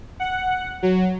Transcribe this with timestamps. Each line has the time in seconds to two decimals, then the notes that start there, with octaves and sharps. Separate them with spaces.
0.20 F#5
0.83 F#3